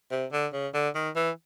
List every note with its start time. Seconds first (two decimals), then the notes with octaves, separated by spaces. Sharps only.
0.11 C3
0.32 D3
0.53 C#3
0.74 D3
0.95 D#3
1.16 E3